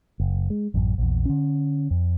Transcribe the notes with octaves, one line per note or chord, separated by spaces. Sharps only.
F#1
G#3
A1 F#2
A#1 E2
D3 C#4
F2